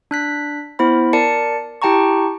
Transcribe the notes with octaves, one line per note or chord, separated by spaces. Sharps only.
D4 F#6 B6
B3 E4 C5 B5
A#4 D5 A5 C#7
E4 G4 G5 A5 A#5 C#6